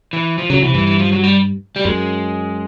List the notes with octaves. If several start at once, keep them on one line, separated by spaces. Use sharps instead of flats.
E3
F3
C#3 F#3
C3 E3
G2 E3
E3
F3
F#3
G3
G3
F#2 G#3